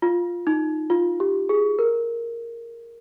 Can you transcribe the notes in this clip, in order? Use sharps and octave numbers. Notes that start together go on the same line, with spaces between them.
F4
D#4
F4
G4
G#4
A#4